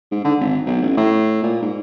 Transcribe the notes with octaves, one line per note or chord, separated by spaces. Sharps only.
G#2
D3
G#1
B1
A1
A2
A#2
G#2